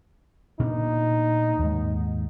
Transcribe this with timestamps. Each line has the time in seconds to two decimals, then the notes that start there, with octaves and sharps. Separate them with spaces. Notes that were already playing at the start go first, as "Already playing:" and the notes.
0.60 A#2 B3 D4 D#4
1.59 D#2 G#2